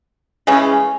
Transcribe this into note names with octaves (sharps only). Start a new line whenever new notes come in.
C#3 E3 G#3 C#4